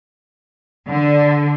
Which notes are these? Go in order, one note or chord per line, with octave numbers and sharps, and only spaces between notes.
D3